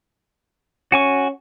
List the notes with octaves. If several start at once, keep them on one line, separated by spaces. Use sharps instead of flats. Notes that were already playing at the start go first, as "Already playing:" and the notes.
C#4 F#4 G#5 C#6